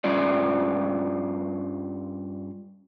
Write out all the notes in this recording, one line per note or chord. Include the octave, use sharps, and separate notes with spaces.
G2 G3 C#4 F4 D5